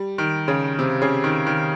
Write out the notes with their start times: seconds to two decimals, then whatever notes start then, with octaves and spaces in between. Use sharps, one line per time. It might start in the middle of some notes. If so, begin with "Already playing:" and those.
Already playing: G3
0.18 D#3
0.48 C#3
0.79 C3
1.02 C#3
1.24 D#3
1.46 D#3